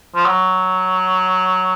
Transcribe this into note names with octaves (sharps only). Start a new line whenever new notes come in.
F3
F#3